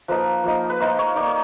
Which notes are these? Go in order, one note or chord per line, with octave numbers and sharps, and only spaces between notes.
F3 A#3 D#4 B4
F3 A#3 D#4
B4
A#3 D#4 C5
C#5
A#3 D#4 D5
C#5